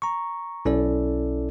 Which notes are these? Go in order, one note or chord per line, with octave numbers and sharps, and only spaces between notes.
A#5 C#6
B1 C#4 E4 A4 D5